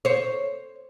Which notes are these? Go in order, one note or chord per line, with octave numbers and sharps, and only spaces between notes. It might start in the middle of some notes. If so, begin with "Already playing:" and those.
C5 C#5